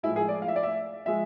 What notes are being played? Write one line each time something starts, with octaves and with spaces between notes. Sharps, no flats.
A2 F3 G#3 E4
G#4
D5
F5
E5
D5
E5
F3 G#3 E5